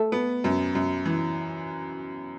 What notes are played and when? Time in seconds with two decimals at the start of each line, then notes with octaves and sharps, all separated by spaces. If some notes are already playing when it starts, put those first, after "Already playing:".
Already playing: A3
0.12 B3
0.44 F#2
0.75 F#2
1.06 E3